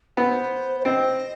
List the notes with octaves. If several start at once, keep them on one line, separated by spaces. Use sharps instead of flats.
B3 C5
C5
C4 D#5